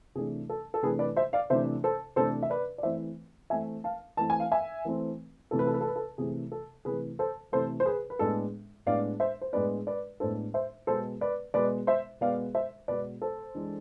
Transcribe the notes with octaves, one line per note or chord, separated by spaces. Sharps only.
C3 E3 A3 D4 G#4
A4
A4
C3 E3 A3 D4 G#4 B4
B4 D5
C5 E5
D5 F5
C3 E3 A3 D4 C5 E5
A4 C5
C3 E3 A3 D4 A4 C5
E5
B4 D5
D5
E3 A3 C4 C5 E5
E3 A3 C4 E5 G#5
F5 A5
E3 A3 C4 A5
G#5
F5
E5 G#5
E3 A3 C4
C3 E3 A3 A4
B4
A4
B4
A4
B4
A4
C3 E3 A3 G#4
A4
C3 E3 A3 G#4 B4
A4 C5
C3 E3 A3 A4 C5
C5
G#4 B4
B4
A2 G#3 B3 D4 A4
A2 G#3 B3 D4 D5 F5
C5 E5
C5
A2 G#3 B3 D4 B4 D5
B4 D5
A2 G#3 B3 D4 A4 C5
C5 E5
B2 G#3 B3 A4 C5
B4 D5
B2 G#3 B3 B4 D5
C5 E5
B2 G#3 B3 D5 F5
C5 E5
B2 G#3 B3 B4 D5
A4 C5
E3 G#3 D4